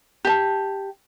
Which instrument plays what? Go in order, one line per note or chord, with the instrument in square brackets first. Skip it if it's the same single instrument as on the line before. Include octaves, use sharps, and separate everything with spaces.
[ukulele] G4 A5